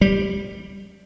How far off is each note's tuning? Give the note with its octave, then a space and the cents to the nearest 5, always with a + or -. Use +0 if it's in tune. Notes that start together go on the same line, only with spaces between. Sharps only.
G3 +0